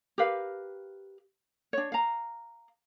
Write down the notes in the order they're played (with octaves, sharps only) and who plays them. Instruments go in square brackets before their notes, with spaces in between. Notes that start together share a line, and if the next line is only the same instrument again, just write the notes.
[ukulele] G4 A#4 B4 F5
D4 C#5
F5 A#5